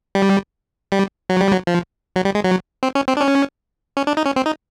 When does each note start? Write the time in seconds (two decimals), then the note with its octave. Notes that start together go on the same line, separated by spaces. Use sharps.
0.15 G3
0.92 G3
1.29 F#3
1.41 G3
1.52 F#3
1.67 F3
2.16 F#3
2.25 G3
2.35 G#3
2.44 F#3
2.83 C4
2.95 C#4
3.08 C4
3.17 D4
3.21 C#4
3.97 C#4
4.07 D4
4.17 D#4
4.26 C#4
4.36 C4
4.46 D#4